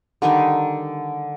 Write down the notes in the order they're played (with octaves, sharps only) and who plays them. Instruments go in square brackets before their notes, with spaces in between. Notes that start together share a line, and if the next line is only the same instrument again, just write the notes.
[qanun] D3 D#3 G3 D#4